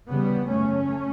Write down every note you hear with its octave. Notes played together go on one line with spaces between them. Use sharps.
E2 C#3 G3 B3
F#2 C#3 A3 C#4